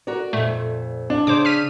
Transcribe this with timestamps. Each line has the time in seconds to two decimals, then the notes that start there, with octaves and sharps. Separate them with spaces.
0.07 F#4 A#4 D5
0.33 F2 A#2 A3
1.10 D4
1.27 C#3 C5 D6
1.45 F6 B6 D#7